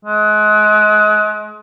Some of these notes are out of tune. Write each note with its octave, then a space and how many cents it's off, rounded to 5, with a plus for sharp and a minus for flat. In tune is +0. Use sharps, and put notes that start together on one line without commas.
G#3 +35